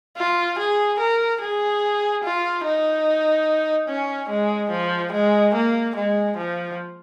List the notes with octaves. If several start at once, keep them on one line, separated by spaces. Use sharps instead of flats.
F4
G#4
A#4
G#4
F4
D#4
C#4
G#3
F3
G#3
A#3
G#3
F3